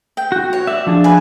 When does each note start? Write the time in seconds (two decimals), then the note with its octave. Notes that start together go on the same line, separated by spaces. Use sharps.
0.17 G5
0.32 F#4
0.53 C#5
0.67 D5 E5
0.87 F3 D4 G#4
1.04 B4 G#5